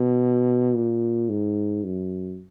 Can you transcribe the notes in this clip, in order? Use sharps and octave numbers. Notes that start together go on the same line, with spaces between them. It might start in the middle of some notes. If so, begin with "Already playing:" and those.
Already playing: B2
A#2
G#2
F#2